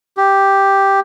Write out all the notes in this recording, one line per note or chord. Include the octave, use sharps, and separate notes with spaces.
G4